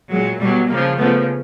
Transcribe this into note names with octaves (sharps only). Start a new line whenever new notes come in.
A#2 F#3 G#3
B2 F#3 G3 A3
C#3 F3 G#3 A#3
C#3 F3 A3 B3